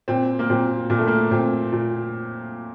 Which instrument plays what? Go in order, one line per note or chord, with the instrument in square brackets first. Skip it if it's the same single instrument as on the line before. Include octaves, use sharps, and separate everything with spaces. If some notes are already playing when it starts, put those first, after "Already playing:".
[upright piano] A#2 C4
A#3
A#2 C4
A#2 A#3
A3
A#3
A#2 C4
A#2